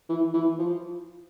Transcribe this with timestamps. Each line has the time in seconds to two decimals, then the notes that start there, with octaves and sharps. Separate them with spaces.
0.09 E3
0.33 E3
0.59 F3